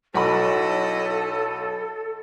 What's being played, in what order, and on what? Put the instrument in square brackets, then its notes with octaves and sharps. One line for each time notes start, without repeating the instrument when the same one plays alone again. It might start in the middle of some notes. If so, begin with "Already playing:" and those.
[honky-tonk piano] B1 F#5 B5 [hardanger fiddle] E4 D#5 [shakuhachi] A4